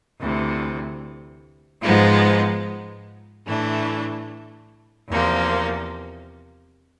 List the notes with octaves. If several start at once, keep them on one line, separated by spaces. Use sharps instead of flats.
D2 C3 E3
G#2 F3 G#3 B3 D#4
A2 E3 A3 D4
E2 C3 F3 A#3